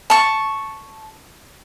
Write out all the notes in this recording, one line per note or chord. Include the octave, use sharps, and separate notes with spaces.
A5 C#6